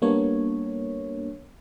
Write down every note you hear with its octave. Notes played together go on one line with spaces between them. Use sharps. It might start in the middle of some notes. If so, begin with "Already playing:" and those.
G3 A#3 B3 D4 C#5